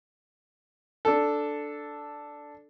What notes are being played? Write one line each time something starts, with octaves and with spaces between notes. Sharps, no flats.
D4 A4